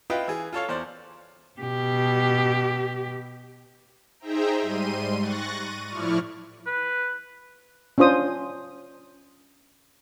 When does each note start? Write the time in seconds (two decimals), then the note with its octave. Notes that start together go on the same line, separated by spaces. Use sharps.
0.10 E4 F4 B4 D#5 F5 G5
0.28 E3 G#4
0.53 F4 A4 C#5 F5
0.68 E2 C5 D5
1.61 B2 G4
4.20 D#4 G#4 C5 E5 G5 A#5
4.61 G#2 G3 C6 D#7
5.18 C#6 F#6 A6 A#6
5.57 D#7
5.87 A2 F3 E4 D5 C#6 F6
6.67 B4
7.98 C#4 D4 F4 C5 D#6